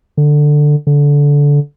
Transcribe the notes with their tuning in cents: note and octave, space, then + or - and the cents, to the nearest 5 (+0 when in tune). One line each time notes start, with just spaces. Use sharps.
D3 +10
D3 -20